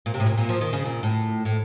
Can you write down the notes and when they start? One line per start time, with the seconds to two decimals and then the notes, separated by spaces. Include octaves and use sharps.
0.06 A#2
0.14 C3
0.20 A2
0.25 A#2
0.38 A#2
0.49 F3
0.61 D#3
0.73 C#3
0.85 A#2
1.03 A2
1.45 A2